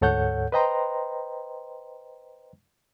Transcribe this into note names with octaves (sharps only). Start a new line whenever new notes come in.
D2 G#2 A4 C#5 F#5 G6
B4 C5 D#5 G5 A#5 C6